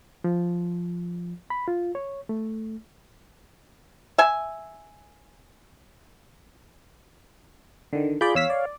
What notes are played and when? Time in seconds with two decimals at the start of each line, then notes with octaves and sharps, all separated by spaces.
0.24 F3
1.50 B5
1.68 F4
1.95 C#5
2.29 A3
4.18 E5 G#5
7.93 D3 D#3
8.21 F4 G#4 D5 B5 G6
8.35 E2 C#5 F5 E6 B6
8.50 D5